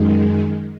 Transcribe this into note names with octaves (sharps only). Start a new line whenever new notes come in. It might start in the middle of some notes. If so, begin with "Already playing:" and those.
Already playing: F#2 D#3 G#3